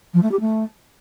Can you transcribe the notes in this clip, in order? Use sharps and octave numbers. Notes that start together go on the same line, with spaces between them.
F3
A3
G4
A3